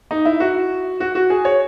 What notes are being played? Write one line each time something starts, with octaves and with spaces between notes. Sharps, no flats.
D#4
E4
F#4
F#4
F#4
G#4
C#5